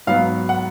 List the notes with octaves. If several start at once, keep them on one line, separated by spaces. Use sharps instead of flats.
G#2 F#3 B3 F5
F#5